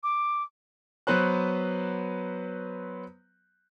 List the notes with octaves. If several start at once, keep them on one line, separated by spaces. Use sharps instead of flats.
D6
F#3 B3 B4 C5 F#6